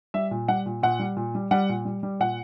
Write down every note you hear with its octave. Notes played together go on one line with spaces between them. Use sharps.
G3 E5
A#2
G3 F#5
A#2
A#2 F#5
G3
A#2
G3
G3 F#5
A#2
G3
G3
A#2 F#5